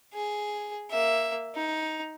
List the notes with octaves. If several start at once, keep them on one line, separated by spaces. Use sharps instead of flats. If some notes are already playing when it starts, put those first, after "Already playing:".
G#4
A#3 E5
D#4